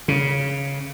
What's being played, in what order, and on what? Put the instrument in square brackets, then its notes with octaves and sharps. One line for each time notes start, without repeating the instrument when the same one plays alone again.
[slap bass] C#3